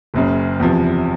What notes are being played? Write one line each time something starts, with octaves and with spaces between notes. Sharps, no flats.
F#1 F#2 C#3
E2 C3 F3